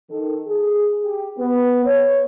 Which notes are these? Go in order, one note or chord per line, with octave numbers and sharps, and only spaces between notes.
D#3 A4
G#4
G4
B3
C#5